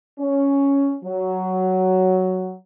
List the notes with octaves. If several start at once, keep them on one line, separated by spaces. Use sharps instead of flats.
C#4
F#3